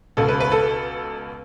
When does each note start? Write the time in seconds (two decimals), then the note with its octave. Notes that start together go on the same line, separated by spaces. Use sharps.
0.17 C#2 B2 A4
0.29 B4
0.40 B4
0.52 A4